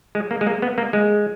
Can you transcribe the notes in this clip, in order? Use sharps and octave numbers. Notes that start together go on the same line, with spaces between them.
G#3
A#3
G#3
A#3
B3
A#3
G#3